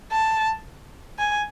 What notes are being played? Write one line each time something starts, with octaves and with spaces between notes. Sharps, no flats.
A5
G#5